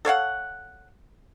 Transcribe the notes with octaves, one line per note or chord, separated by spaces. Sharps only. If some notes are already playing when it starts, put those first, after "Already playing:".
A4 C#5 F5 F#5